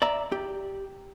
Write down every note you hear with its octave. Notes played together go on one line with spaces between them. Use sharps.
D5 E5 A#5
G4